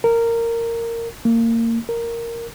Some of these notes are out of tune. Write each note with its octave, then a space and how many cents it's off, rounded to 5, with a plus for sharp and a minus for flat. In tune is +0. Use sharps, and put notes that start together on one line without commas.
A#4 -15
A#3 -25
A#4 -5